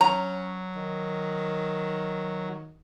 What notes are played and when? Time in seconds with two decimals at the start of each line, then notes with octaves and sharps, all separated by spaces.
0.01 F#3 C#4 A#5
0.76 D#3